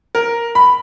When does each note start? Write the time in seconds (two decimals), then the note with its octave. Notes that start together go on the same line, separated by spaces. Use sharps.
0.15 A#4
0.55 B5